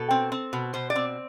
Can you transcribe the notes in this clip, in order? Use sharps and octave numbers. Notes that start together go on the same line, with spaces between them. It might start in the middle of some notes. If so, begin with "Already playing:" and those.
Already playing: B2 A4
C4
C4
B2
B2 C5
D5
C4